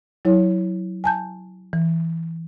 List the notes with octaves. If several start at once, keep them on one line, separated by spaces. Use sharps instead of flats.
F#3 E4 C#5
G#5 A5 G6
E3